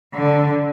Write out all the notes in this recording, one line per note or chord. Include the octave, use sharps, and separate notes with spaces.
D3